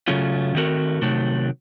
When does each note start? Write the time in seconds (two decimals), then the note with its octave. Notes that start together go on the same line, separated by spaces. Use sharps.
0.08 C#3 F#3 A3 C#4 F4
0.55 D#3 A3 C4 F#4 A#4
1.02 C3 D#3 F#3 A3